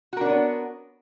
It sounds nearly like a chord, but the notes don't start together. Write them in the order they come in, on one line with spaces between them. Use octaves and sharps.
F#4 A#4 D4 C#5 B3